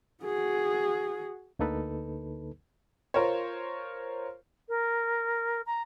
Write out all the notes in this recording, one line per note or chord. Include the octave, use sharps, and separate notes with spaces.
F#4 G#4
D2 D3 A#3 D#4 A4 B4
F4 A#4 C5 C#5
A#4
A#5